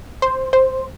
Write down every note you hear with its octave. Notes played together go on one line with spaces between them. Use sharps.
C5
C5